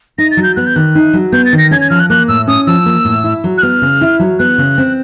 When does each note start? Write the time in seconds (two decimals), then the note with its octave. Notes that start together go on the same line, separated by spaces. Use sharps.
0.18 D#4 A#6
0.31 A6
0.37 F#3
0.43 G6
0.56 B3 F#6
0.67 G6
0.76 D#3 F#6
0.95 D#4
1.13 F#3
1.32 B3 G6
1.45 A6
1.53 D#3
1.58 A#6
1.71 C#4 G#6
1.81 G#6
1.90 F3 F6
2.00 F#6
2.10 A#3 F#6
2.28 A2 E6
2.47 C#4 D#6
2.67 F3 E6
2.86 A#3
3.05 A2
3.24 E4
3.44 F#3
3.58 F#6
3.62 B3 F6
3.82 C#3
4.01 E4
4.19 F#3
4.39 B3 F#6
4.58 C#3
4.78 C4